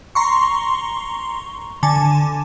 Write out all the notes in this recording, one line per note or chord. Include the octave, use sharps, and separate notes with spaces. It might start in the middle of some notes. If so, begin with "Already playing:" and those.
A#5 C6 C#6
D3 G#5 A5